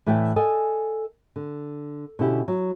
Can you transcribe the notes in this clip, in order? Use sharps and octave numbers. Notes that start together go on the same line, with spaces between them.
A2 E3 E4 C#5 D5 G5
A4 D5 D#5 F#5 G#5
D3
B2 D3 C#4 E4 G4
F#3